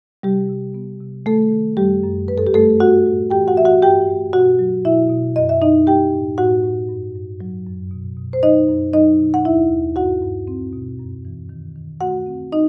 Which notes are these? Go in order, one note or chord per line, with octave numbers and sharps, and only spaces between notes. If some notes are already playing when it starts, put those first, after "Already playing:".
C3 G3 G4
C3
B3
C3
D#3 A3 A4
D#3
F#2 G3 G4
F#2
G2 B4
A4
G4
G3 A3 A4
B3 F#4 F#5
A2
E3 G4 G5
F#4 F#5
E3 E5
F#4 F#5
G2 G4 G5
A3
B2 F#4 F#5
F#3
B2 E4 E5
B2
F#2 D#5
E5
F#2 D#4 D#5
G3 G4 G5
A2
A2 F#4 F#5
A2
G2
G2
F#3
F#2
B2
B2
C5
F#3 D#4 D#5
F#2
F#3 D#4 D#5
B2
F#5
D#2 E4 E5
D#2
G2 F#4 F#5
G2
C4
B2
F#2
E3
D#3
D#3
A3 F#4 F#5
C4
D#4 D#5